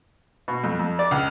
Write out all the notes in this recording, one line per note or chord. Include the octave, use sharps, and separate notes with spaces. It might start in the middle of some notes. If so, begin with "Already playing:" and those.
B2
F2
F2
D5
C#2